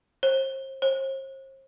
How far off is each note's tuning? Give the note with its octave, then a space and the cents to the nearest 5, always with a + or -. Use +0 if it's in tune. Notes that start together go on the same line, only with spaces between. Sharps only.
C5 +35
C5 +40